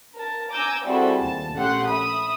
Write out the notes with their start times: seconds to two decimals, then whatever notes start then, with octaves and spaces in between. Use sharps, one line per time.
0.16 A#4 A5
0.53 G#5 A#5 D6 E6 G6
0.86 G3 C4 E4 F#4 G#4 A4
1.19 D#2 A5
1.54 A#1 A3 C#4 G4 F#5 C6
1.88 E5 B5 D#6